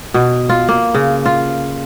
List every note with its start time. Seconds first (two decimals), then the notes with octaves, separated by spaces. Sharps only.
0.14 B2
0.49 F4
0.69 A#3
0.94 C#3
1.26 F4